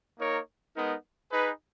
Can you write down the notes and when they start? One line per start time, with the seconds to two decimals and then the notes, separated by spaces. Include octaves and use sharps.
0.19 A#3 D#4 A#4 C#5
0.75 G#3 B3 D#4 A#4
1.31 D#4 G#4 B4